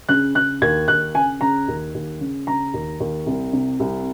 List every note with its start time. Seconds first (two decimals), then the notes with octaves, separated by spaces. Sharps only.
0.09 C#3 F#6
0.35 C#3 F#6
0.61 D#2 G#6
0.88 D#2 F#6
1.15 C#3 G#5
1.41 C#3 A#5
1.68 D#2
1.94 D#2
2.21 C#3
2.47 C#3 A#5
2.74 D#2
3.00 D#2
3.26 C2
3.53 C3
3.80 C2